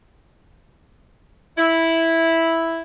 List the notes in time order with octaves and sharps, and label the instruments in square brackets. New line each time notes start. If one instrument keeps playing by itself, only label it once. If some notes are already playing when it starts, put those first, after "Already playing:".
[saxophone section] E4